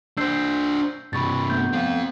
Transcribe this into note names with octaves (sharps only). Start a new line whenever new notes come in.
D4 C5 E6 G6 C7
G2 C3 B5 C#6 A6
A3 B3 G6
C4 F5